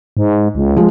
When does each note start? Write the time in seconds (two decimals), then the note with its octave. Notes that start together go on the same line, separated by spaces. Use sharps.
0.17 G#2
0.55 C#2
0.77 F3 G#3